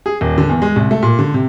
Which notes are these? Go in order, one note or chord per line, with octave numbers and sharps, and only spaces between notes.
G#4
D#1
D3
E2
G#3
C2
A3
A#2
D3
C3